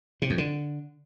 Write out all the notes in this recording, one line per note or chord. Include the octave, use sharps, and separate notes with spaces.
C3
F2
D3